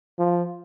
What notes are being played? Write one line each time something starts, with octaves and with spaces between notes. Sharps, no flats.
F3